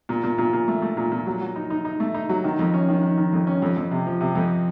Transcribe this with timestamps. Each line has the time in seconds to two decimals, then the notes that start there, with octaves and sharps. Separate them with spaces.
0.09 A#2
0.23 A#2
0.38 A#2
0.53 A#2
0.68 A3
0.82 A3
0.97 A#2
1.12 A#2
1.27 F#3
1.41 F#3
1.56 D#4
1.70 D#4
1.85 D#4
2.00 A3
2.14 D#4
2.29 F#3
2.44 D#3
2.59 F2
2.74 C#4
2.89 D#3
3.03 D#3
3.17 D#3
3.33 F2
3.47 C#4
3.62 F2
3.77 F2
3.91 C3
4.06 F3
4.21 C3
4.35 F2